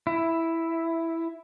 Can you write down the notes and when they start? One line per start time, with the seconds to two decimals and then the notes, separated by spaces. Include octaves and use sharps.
0.07 E4